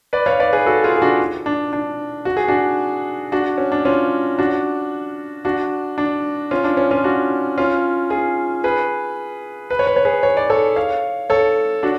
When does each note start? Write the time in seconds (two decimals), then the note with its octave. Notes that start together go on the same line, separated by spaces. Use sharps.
0.13 B4 D5
0.26 C#5 F5
0.40 B4 D5
0.53 G#4 B4
0.66 F#4 A4
0.84 F4 G#4
0.96 G#4
1.02 D4 F#4
1.46 D4
1.73 D4
2.25 F#4
2.37 G#4
2.48 D4 F#4
3.32 D4 F#4
3.58 C#4
3.72 D4
3.85 C#4 F4
4.39 D4 F#4
5.45 D4 F#4
5.98 D4
6.51 C#4 F4
6.64 D4
6.77 C#4
6.91 C#4 F4
7.04 D4 F#4
7.58 C#4 F4
8.10 F4 G#4
8.64 G#4 B4
9.70 B4
9.79 C#5
9.87 B4
9.96 C#5
10.05 G#4 B4
10.23 C#5
10.37 D5
10.50 A4 C#5
10.76 C#5 F5
11.30 A4 C#5
11.83 D4 F#4